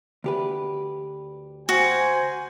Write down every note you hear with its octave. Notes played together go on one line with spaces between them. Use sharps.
D2 G4 B4
F#4 C5 G#5